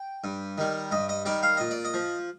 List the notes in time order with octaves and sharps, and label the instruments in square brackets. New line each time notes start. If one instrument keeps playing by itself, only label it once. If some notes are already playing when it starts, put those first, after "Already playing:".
Already playing: [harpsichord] G5
G2
D#3 G3
G2 D#5
D#5
D#3 G3 D5
F5
A#2 D#5
D5
D#5
F3